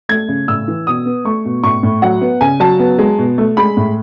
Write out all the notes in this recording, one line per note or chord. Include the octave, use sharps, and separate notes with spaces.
A3 G#6
C#3
A2 E6
E3
B2 D#6
B3
A3 C#6
B2
A2 C#6
A2
F#3 F#5
B3
C#3 G#5
F#3 A5
B3
G#3
B2
A3
G#3 B5
A2